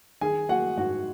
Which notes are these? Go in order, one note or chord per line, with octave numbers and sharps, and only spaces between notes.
D#3 G#4 G#5
A#3 F#4 F#5
G#2 F#4 F#5